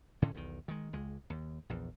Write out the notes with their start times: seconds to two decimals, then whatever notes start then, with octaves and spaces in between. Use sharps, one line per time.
0.22 A2 D3 C#4
0.34 B1 E2 D#3
0.68 D#3 G#3
0.93 C#2 G#3
1.30 D#2
1.69 A#1 E2